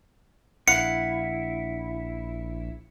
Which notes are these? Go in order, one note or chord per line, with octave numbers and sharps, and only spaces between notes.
A#1 E4 F5 F#5 C#7